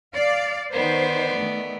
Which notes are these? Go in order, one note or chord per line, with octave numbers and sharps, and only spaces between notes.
D5 F5
D#3 B3 C5 D5
D#3 A3